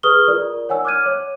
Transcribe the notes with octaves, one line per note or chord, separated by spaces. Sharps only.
G#4 B4 C#6 D#6 F6 G7
F4 A#4 D5
C#5 F#5 G#5 E6
D6 F6 F#6 G#6 D#7
C#5